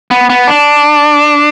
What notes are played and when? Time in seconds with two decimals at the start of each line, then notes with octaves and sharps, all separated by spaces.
0.11 B3
0.30 B3
0.48 D4